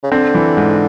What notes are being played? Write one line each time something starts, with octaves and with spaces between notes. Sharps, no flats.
C#3
D3 C4
E3
G#2